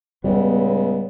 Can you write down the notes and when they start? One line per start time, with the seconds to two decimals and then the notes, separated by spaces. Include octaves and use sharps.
0.24 C#2 A2 G3 B3